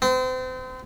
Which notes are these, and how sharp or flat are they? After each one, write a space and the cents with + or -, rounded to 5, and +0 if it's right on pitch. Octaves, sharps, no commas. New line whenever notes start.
C4 -35